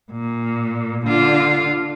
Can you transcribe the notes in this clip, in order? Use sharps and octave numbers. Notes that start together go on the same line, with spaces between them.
A#2
D3 F4